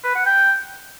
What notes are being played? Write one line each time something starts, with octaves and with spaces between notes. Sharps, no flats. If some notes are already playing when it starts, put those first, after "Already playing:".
B4
F#5
G5